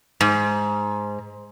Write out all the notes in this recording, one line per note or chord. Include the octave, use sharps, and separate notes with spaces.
G#2